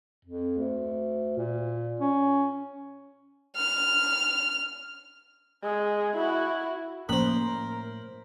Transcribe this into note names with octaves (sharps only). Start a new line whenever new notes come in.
F2
D2
A#2
C#4
F6
G#3
E4 F#4
A2 F3 A#3 C#4 A#4 C5 B5